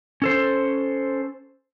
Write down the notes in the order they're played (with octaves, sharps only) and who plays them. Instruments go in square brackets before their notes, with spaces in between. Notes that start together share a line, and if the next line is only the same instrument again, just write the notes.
[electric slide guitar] C#4 A4 C5